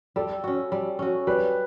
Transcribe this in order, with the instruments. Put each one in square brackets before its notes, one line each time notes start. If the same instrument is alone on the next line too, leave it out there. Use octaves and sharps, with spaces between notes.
[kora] G3 [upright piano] A4
[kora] C#4 F#4
G3
C#4 F#4
[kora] G3 [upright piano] B4